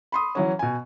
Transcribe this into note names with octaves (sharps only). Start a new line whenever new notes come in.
B5 C6 D#6
E3 F#3 C#4
B2 G#5